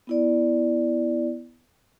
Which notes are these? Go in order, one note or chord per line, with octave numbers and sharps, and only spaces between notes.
B3 E4 D5